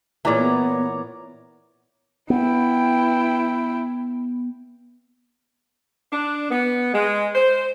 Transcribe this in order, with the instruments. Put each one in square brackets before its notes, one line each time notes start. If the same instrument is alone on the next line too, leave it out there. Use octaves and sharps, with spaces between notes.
[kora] A#2 E3 [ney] G#4 [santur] C#5 D5 A#5
[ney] B3
[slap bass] B3 [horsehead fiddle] E4 G5
[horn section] D4
B3
G#3
C5